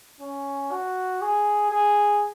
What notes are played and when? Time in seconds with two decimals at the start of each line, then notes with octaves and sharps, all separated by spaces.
0.21 C#4
0.72 F#4
1.22 G#4
1.71 G#4